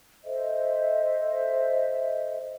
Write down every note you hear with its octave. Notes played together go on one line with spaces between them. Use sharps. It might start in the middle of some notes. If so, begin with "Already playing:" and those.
A4 C5 D#5 E5